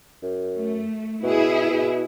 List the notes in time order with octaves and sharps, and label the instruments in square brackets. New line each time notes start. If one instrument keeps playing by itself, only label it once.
[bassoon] F#2
[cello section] A3
[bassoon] B2 [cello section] E4 G#4
[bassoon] B2